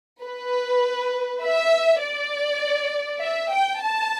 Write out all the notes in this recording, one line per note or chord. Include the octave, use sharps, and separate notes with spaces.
B4
E5
D5
E5
G5
A5